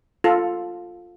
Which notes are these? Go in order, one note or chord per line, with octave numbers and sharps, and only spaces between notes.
F4 A4